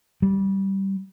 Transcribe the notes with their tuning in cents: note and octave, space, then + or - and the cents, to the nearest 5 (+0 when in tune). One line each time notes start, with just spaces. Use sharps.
G3 -15